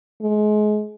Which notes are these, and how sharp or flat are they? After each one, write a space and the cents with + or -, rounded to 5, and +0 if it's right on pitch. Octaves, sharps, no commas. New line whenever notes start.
G#3 +30